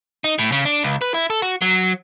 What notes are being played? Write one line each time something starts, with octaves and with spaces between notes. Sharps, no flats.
D#4
A2
C#3
D4
C#2
B4
E4
A4
F#4
F#3